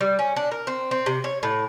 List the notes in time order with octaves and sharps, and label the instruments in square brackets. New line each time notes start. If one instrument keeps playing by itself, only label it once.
[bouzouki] G3
C#4
D4
A#4
C4
C4
C3
C#5
A2